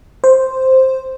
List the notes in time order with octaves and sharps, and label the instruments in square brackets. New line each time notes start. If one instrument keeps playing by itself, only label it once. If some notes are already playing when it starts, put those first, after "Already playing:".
[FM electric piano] C5